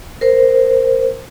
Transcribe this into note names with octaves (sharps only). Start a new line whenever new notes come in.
A#4 C5